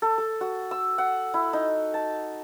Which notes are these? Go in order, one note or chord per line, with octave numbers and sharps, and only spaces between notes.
A4
A4
F#4
E6
F#5
E4
D#4
A5